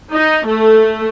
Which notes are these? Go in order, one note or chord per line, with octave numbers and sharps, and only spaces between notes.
D#4
A3